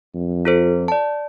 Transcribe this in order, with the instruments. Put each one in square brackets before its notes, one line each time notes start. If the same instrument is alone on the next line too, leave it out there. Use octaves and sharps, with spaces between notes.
[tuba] F2
[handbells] F4 A4 C5
D5 A5